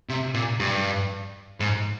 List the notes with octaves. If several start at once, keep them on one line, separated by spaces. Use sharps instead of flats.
C3
A#2
G2
G#2